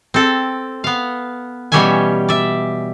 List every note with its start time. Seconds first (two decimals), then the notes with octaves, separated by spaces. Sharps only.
0.14 C4 A4
0.84 B3 F5
1.72 B2 E3 G3 C#4 E5 G#5
2.29 D5 E5